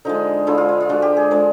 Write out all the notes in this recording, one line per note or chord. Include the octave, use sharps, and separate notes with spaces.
D3 F3 G#3 D#4
D3 F3 G#3 E4
F4
E4
F4
D3 F3 G#3 F#4
G4
G#4
D3 F3 G#3